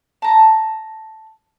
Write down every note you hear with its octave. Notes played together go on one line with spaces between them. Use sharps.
A5 A#5